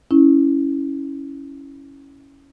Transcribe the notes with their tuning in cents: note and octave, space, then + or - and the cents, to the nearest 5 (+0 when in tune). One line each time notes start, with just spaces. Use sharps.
C#4 +0 E4 -15